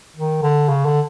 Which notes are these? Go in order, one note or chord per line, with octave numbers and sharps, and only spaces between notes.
D#3
D3
C#3
D3